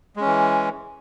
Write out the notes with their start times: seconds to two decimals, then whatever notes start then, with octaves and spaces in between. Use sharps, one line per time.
0.17 G#3
0.21 C#4
0.25 E3